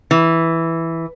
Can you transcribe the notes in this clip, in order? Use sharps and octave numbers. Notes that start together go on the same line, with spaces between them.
E3